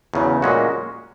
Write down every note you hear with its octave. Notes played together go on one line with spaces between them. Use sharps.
E2 C#3 F#3
A#2 G#3 C#4 F#4